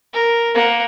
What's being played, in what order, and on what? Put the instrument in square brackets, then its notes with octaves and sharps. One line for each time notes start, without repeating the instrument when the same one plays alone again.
[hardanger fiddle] A#4
A#3 F#5